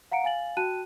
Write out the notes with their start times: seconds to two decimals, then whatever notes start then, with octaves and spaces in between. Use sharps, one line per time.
0.12 F5 F#5 A#5 C#7 D7
0.24 F5 G#5 A6 F#7
0.57 F#4 G5 A5 F#6 D#7